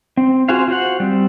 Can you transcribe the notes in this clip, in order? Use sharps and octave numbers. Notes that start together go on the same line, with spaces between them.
C4
F4 F#4 G#4 C5 F5
F4 F#4 C5 F#5
G3 C4